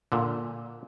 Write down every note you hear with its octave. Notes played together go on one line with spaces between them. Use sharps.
A#2 D3